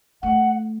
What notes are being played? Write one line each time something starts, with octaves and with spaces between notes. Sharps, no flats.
A3 F#5